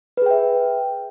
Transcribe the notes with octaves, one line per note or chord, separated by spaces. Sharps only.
G#4 B4 E5 G5